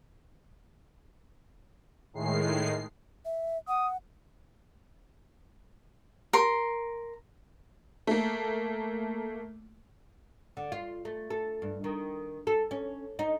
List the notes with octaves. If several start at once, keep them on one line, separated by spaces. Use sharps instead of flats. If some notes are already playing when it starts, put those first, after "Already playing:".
A2 D#3 G#3 C7
E5
F#5 D#6
A#4 C6
A3 A#3
D3
F4
A3
A4
G2
D#3
A4
C#4
D#4